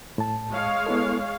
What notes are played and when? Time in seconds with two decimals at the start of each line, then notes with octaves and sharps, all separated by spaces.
0.18 A2 A5
0.50 G#3 C#5 F5
0.86 B3 E4 A4